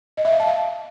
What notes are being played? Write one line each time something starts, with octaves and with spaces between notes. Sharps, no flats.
D#5
E5
F5
A5
F5